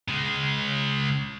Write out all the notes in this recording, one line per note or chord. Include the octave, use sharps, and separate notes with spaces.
C#3 G#3